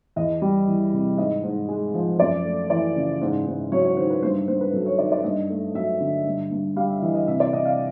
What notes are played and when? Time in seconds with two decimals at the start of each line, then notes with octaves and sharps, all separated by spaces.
0.16 E2 D#5
0.42 G3
0.68 E3
0.93 C3
1.18 G#2 D#5
1.43 G#2
1.69 G#3
1.94 F3
2.20 F#2 D5
2.45 A3
2.70 E3 D5
2.96 C#3
3.21 G#2
3.47 G#2
3.72 F#3 C#5
3.85 C#5
3.97 D#3 C5
4.10 B4
4.23 G2 C5
4.48 G2 C5
4.61 B4
4.73 F#3 A4
4.86 C#5
4.99 D#3 D5
5.12 D5
5.24 G2 D#5
5.50 A3
5.75 F#3 E5
6.00 D3
6.26 G2
6.51 G2
6.76 G3 F5
6.90 E5
7.02 E3 D#5
7.15 D#5
7.27 C3 E5
7.40 D5
7.52 C3 D#5
7.65 F5